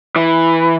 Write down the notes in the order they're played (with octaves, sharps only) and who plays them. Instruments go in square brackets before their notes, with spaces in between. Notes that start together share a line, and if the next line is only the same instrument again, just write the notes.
[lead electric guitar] E3